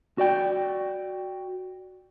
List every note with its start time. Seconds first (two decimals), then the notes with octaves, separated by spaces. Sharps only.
0.18 F#4 D5 G5